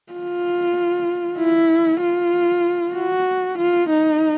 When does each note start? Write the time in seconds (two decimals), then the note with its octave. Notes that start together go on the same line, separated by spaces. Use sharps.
0.12 F4
1.39 E4
2.01 F4
2.94 F#4
3.57 F4
3.89 D#4